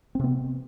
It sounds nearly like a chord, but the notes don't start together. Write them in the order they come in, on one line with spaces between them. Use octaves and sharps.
C4 C3 B3